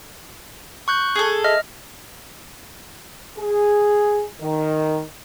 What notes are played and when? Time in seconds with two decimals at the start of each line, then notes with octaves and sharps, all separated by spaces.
0.88 C#6 F#6 G6
1.15 G#4 A4
1.44 D#5 E5 F6
3.38 G#4
4.41 D#3